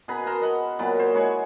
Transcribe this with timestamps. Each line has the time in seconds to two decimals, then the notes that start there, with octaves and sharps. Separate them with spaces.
0.08 B2 G#4 B4 A#5
0.26 A#4 A5 A#5 C6
0.41 D#5 F#5 B5
0.79 A#2 F#3 B3
0.99 C5 C#5
1.14 G#3 E4 B4 C#5